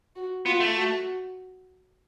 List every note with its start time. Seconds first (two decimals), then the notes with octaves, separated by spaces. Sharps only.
0.16 F#4
0.45 B3 F4
0.60 A3
0.75 F#4